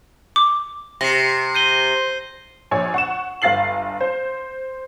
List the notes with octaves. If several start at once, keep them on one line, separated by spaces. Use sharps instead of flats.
D6
C3 A#6 C7
G6 D#7 G7
A#1 C#5 G#5
F#5 C#6 E7
G1 F5 A6 C7 F#7
C5